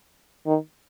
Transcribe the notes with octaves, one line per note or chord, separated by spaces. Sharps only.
D#3